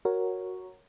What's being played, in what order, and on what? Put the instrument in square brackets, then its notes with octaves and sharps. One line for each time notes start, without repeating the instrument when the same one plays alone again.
[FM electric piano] F#4 A#4 C#5